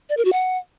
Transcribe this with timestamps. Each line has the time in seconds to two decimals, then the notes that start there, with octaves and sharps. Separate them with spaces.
0.09 D5
0.17 A#4
0.25 F#4
0.33 F#5